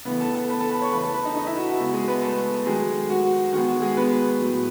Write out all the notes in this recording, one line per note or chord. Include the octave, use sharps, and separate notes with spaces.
C#3 E3 A3 B3 B4
A4 A5
A4 A5
B4 B5
A4 A5
B4 B5
C#5 C#6
C#3 E3 A3 B4 B5
A4 A5
B4 B5
D#4 D#5
D#4 D#5
E4 E5
F#4
F#4
C#3 G#3 B3 F#4
G#3 G#4
B3 B4
A3 A4
D#3 F#3 G#3 A3 G#4
F#4
D#3 G#3 B3 F#4
F#4
G#3 G#4
B3 B4
A2 F#3 A3